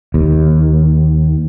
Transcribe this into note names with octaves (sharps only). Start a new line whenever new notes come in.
D#2